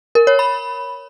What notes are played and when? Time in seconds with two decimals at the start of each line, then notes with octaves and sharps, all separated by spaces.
0.15 A#4
0.27 C#5
0.39 B5